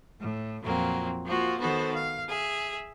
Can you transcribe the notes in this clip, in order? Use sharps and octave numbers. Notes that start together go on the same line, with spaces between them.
A2
F2 A#2 F#3 A#3 C4
F3 A#3 F4 F#4
D#3 B3 F#4 A4 C5
F5
G#4 E5